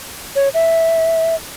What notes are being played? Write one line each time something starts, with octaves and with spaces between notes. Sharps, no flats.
C#5
E5